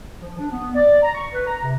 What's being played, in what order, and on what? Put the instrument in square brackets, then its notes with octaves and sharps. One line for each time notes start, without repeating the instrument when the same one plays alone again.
[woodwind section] F3
D4
B3
D5
A#5
C#6
B4
A#5
C3